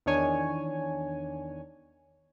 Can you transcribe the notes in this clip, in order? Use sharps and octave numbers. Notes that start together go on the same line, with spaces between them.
E2 D#3 D4 C#5 G#5